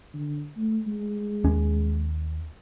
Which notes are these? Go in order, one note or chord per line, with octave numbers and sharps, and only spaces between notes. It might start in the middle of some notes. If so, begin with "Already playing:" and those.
D3
A3
G#3
D#2 C#4